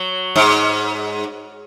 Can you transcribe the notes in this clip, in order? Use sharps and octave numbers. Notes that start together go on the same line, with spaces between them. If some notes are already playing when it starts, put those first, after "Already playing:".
Already playing: F#3
G#2